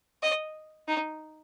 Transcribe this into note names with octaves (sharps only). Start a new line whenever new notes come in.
D#5
D#4